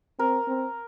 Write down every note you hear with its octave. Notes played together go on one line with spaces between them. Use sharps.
C4 A#4
C4